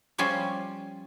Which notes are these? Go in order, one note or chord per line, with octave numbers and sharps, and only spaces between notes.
F3 G3 C#4 F4 G#5